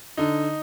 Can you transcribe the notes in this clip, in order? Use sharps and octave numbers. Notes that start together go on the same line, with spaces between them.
D3 D#4